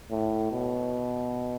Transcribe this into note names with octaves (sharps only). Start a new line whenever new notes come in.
A2
B2